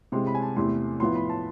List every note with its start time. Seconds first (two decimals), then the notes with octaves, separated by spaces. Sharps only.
0.12 C3 G#3 C4 E4 C6
0.27 B5
0.35 G#5
0.42 A5
0.56 E2 C3 E3 A3 E4 C6
1.00 A2 F3 B3 E4 C6
1.15 B5
1.29 A5